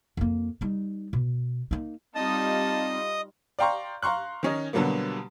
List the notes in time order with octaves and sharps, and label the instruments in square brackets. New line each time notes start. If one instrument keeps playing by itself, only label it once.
[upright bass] F2 A#3
G3 D#4
B2
A#3 D#4
[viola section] G3 D#4 F4 [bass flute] C4 [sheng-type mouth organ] D#5 D#6 [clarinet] A5
[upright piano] D5 F5 G5 A#5 C6 C#6
F5 A#5 C6 C#6 F#6
D#3 C#4 D#4
B2 D3 F#3 G3 A#3 B3